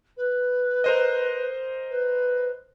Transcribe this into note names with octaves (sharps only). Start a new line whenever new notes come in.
B4
A#4 C5 D#5
B4